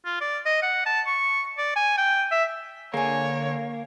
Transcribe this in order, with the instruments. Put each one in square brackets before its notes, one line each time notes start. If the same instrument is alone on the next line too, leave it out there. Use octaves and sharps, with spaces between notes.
[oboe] F4
D5
D#5
F#5
A5
C#6
D5
G#5
G5
E5
[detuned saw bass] D3 [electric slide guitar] A#3 [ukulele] G#4 G#5 [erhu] C#5